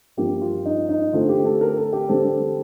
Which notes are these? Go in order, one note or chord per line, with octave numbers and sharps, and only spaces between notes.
G2 F3 A#3 G4
F4
D#4
D#4
D3 A3 C4 F4
G4
A4
A#4
A4
G4
D3 G3 C4 A4